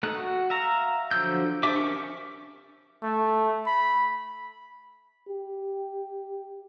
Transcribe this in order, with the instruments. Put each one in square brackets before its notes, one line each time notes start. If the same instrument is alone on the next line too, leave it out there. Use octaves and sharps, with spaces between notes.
[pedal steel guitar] A3 D#4 F#6
F#4
E5 F5 A#5
D3 F3 F#3 E6 G6
D4 G4 C5 E5 D6
C#4 A#4 C#6
[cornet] A3
B5
[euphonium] G4